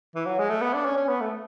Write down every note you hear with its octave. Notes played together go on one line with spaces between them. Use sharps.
E3
F#3
G#3
A3
B3
D4
C#4
C#4
B3
A3